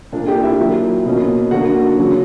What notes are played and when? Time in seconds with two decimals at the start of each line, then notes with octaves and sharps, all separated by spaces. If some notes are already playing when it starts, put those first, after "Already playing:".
0.12 A#2 A#3 D4
0.28 G4 G5
0.43 E4 E5
0.59 A#2 F#3 A#3 E4
1.05 B2 A#3 C#4
1.51 D3 A#3 D4 F#4 F#5
1.97 C#3 F#3 C#4